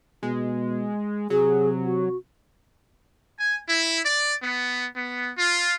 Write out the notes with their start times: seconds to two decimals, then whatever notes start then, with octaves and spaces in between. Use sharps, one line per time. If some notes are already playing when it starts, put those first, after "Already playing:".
0.23 B2 G#3
1.30 C3 F#3 G#4
1.85 F#4
3.38 G#5
3.67 E4
4.04 D5
4.43 B3
4.95 B3
5.36 F4